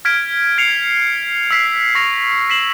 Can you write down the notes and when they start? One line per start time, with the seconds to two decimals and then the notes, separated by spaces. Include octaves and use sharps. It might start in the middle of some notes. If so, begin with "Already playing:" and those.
0.05 F6 G#6 B6 D7
0.58 G#6 C7 C#7 F7
1.51 E6 B6 C7
1.95 C#6 A#6 F7
2.49 B6 C7 E7 F#7